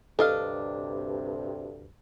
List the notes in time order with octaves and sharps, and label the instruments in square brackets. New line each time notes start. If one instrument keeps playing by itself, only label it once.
[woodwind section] D2 G2 C3 [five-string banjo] D4 D#5 F5 [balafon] A4